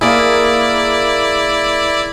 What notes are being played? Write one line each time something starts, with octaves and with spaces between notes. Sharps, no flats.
A#3 E4 G#4 D5